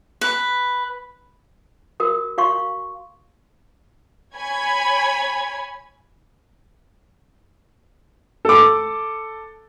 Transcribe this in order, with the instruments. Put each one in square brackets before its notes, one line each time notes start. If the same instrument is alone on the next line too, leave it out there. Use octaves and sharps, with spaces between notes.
[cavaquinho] B4
[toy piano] F#4 A#4 D#6
F#4 F5 C6 C#6
[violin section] C#5 G#5 B5 G#6
[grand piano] A4 D6